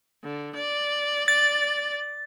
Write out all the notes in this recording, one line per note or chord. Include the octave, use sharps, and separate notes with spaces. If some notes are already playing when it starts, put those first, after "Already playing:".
D3
D5
D5 A6